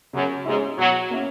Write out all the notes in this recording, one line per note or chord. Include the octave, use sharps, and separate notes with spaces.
F#2 C#3
G#2 G#3 C#4 E4
B2 F#3
A#3 C#4 E4